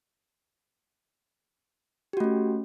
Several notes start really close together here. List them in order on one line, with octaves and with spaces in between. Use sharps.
G4 F#4 A3 C#4